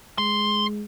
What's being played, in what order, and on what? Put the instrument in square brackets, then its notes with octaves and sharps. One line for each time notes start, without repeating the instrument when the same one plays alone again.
[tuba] G#3 [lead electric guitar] C6